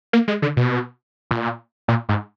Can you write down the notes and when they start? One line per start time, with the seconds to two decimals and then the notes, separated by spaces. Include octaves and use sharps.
0.13 A#3
0.28 G#3
0.42 D3
0.57 B2
1.31 A#2
1.88 A#2
2.09 G#2